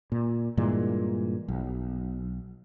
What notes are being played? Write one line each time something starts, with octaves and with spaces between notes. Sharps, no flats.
A#2
G2 A#2 E3 G#3
B1